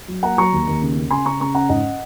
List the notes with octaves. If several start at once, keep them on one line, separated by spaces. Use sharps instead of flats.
F#3
A#3 F#5 A#5
F#3 A#5 C#6
D#2
D#2
C#3
C#3
C#3 G#5 C6
C#3 A#5 C#6
C#3 A#5 C#6
C#4 F#5 A#5
G#2 D#5 F#5